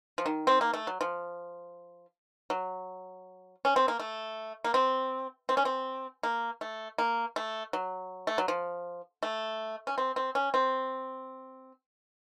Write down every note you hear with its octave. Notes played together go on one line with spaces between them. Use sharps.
F3
D#3
C4
A#3
A3
F#3
F3
F#3
C#4
C4
A#3
A3
A#3
C4
C4
C#4
C4
A#3
A3
A#3
A3
F#3
A3
F#3
F3
A3
C#4
C4
C4
C#4
C4